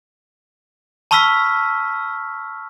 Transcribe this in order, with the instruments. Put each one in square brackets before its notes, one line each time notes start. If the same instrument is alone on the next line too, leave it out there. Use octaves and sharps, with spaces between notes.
[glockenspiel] A5 B5 C#6 E6 F6 B6